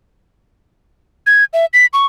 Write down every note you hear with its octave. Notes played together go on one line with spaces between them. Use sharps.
G#6
E5
B6
C#6